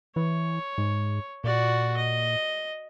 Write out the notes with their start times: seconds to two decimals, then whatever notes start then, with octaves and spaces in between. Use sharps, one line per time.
0.16 E3 C#5
0.78 G#2
1.44 A#2 F#4 D5
1.97 D#5